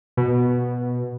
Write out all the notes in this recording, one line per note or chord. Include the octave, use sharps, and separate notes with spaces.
B2